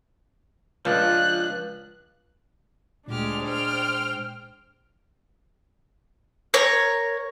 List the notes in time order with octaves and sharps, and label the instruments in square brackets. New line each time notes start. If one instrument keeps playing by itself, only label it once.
[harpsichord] C#2 [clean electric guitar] F3 D4 [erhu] F#6
[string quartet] D2 G4 F6 [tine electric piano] A#2 [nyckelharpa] G#3 D4
[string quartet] C5 G5 F6
[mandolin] A#4 C#5